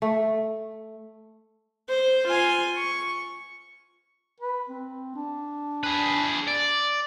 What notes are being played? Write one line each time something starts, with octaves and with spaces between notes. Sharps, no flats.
A3
C5
F4 G#5
C#6
B4
C4
D4
G#4 B4
D5